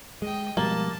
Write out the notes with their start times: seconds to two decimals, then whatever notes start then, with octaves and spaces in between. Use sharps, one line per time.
0.22 G#3 D#5 G5
0.57 B2 F3 G3 G#3 A#3 A5